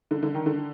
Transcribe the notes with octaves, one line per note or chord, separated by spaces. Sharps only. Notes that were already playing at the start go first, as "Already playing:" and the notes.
D3
D3
D#3
D3